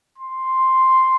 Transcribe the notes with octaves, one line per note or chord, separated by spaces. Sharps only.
C6